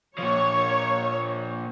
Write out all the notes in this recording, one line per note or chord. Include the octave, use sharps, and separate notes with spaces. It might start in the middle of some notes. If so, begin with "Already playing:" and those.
A#2 F3 C#5